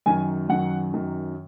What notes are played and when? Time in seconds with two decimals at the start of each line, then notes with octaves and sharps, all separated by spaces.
0.06 F#2 D#3 F#3 G#5
0.49 F#2 D#3 F#3 F#5
0.93 F#2 D#3 F#3